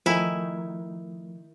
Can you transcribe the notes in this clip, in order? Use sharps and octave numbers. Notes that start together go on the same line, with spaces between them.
D#3 F3 A3 E4 G#5